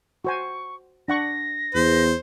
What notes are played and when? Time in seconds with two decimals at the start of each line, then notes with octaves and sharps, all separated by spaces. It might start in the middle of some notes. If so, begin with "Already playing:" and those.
0.25 F#4 C5 G#5 C#6
1.08 D4 F#5 C#6 A#6
1.75 E2 C5